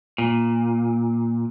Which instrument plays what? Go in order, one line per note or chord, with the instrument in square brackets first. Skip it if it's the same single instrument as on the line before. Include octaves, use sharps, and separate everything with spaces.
[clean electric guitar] A#2